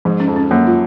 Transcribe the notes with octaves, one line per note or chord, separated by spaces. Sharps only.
G#2 F3
C#4
F2
C#4
F#2 A#3
F4